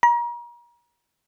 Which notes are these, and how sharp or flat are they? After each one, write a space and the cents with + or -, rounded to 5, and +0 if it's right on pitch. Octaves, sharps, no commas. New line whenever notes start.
A#5 +35